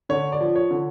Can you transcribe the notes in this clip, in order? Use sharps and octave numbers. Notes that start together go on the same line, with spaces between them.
D3 C#5
D5
F3
C#5
D3